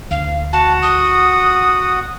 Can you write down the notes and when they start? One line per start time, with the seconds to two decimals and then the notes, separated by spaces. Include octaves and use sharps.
0.11 D2 F5
0.53 F#4 F#5 A5
0.82 D#6